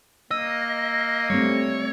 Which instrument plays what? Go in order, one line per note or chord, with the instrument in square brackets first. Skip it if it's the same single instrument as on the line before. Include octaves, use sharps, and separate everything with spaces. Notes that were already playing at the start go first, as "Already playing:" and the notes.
[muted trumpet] A#3 [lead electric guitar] D#5 [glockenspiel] E6
[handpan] G3 A3 C4 [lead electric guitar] C#5